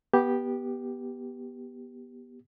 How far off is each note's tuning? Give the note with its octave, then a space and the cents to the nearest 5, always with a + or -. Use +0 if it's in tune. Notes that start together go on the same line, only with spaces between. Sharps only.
B3 -20 G4 +0